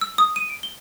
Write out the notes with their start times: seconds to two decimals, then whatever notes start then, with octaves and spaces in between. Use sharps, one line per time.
0.01 E6
0.18 D#6
0.36 D#7
0.50 D7
0.63 G7